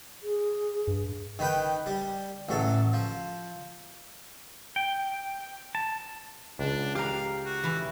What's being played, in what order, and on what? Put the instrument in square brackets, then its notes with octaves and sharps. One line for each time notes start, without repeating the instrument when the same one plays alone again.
[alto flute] G#4
[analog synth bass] G2
[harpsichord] D#3 B4 G5
G3
A1 F#3 A4
F3
[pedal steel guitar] G5
A5
[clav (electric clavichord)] C#2 [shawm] D4
[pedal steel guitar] G4 A#5 [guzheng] A#4 F#5 A5 [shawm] F5
[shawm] F#4
[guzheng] E3 E4 F5